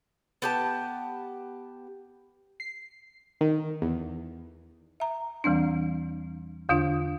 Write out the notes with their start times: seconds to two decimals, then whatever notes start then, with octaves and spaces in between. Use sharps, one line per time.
0.42 B3 G4 A5
2.60 C7
3.41 D#3
3.82 E2
5.00 E5 A#5
5.44 E2 E3 G3 C4 D4
6.69 E2 D3 D4 F4